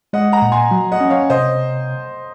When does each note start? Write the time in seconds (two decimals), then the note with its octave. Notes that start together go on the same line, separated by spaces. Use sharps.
0.13 G#3 D#5 F#5
0.32 F#5 A#5
0.42 A#2
0.52 G#5 C6
0.71 F#3
0.92 D#5 F#5
1.01 C#4
1.10 C#5 F5
1.30 C3 C5 D#5